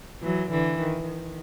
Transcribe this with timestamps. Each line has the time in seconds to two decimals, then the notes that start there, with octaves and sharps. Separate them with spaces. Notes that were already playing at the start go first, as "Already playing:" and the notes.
0.22 E3 F#3
0.50 D3 E3
0.79 D#3
1.08 D#3